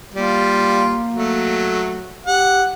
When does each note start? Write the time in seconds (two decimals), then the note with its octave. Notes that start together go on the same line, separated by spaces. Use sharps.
0.14 G3 A#3 F4
1.12 F#3 A3
2.26 G4 F#5